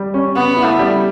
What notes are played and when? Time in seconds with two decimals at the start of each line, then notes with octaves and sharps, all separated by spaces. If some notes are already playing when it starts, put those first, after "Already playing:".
Already playing: G3
0.14 C#4
0.35 C#3 B3
0.57 E4
0.64 A3
0.79 G3